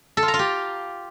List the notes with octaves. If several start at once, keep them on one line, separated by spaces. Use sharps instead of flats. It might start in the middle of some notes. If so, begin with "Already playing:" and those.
A4
F4
A#5
F4
G4